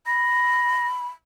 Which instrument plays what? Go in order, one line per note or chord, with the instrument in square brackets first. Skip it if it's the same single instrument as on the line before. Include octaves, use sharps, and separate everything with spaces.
[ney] B5 [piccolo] A#6